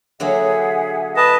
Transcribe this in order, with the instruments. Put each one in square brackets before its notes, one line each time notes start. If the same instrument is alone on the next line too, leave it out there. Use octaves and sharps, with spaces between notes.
[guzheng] D3 F#3 A#3 [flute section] G#4 E5 F#5
[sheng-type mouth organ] B4 A5 [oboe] D#5